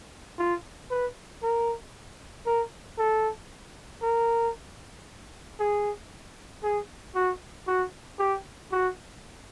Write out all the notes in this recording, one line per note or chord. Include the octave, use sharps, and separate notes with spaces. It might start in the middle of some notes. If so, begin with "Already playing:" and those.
F4
B4
A#4
A#4
A4
A#4
G#4
G#4
F#4
F#4
G4
F#4